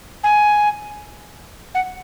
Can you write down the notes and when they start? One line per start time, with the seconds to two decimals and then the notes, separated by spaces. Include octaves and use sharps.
0.23 G#5
1.75 F#5